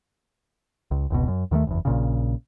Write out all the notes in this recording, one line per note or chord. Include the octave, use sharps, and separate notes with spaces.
C#2
F1 C#2 B2
F#2
D#2 D#3 E3 A3
F#1 E2
A#1 A#2 C#3